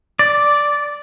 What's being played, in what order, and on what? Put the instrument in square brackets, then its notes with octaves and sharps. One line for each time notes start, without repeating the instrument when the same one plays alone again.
[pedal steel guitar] D5